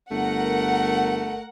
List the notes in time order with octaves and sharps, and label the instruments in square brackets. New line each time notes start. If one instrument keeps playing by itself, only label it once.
[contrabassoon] G1 [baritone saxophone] A3 [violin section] A#4 F#5